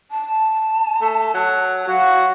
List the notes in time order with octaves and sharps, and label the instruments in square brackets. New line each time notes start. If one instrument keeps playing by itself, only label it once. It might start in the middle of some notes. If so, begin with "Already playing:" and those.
[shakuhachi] A5
[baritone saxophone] A3
F#3
[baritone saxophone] F#3 [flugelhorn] F#4 [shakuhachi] F5